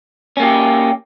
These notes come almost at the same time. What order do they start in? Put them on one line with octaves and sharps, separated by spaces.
C#4 A#3 G4